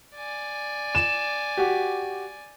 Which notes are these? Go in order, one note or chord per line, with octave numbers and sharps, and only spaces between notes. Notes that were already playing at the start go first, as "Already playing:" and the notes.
D5 G#5
E7
F#4 G4